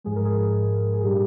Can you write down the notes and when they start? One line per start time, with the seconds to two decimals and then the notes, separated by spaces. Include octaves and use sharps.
0.04 G#2 F3 G#3 G#4
0.16 A#4
0.25 G#4
0.94 G#4
1.04 A#2 G3 D4 G4